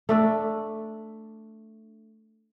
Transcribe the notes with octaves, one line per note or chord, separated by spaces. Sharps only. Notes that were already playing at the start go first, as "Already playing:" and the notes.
A3 D4 A4